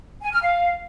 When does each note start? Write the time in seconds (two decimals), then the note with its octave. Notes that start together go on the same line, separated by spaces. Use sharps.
0.22 G#5
0.32 F6
0.42 F5